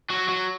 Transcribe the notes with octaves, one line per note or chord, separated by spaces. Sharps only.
F#3 F#4
F#3 F#4